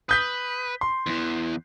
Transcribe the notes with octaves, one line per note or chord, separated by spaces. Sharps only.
B4 D#6 G6 B6
C6
E2 E3